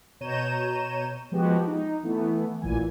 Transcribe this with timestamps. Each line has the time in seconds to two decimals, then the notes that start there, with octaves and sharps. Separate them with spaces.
0.21 B2 C#5 A#5 G6 D#7 E7
1.32 F3 G#3 B3 F#4 G4
1.67 D#4
2.03 E3 A3 B3
2.61 A1 A#2 E3 G#5